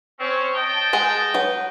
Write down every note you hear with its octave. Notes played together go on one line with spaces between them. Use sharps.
C4 C#4 C#5
D#5 G5 A5
G#3 G#4 F#5
F#3 B4